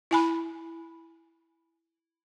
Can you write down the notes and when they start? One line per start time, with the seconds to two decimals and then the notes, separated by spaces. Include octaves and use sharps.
0.11 E4 G#5 B5